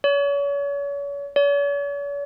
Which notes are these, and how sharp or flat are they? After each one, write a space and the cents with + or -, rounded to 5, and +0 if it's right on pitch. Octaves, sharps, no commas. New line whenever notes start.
C#5 +35
C#5 +45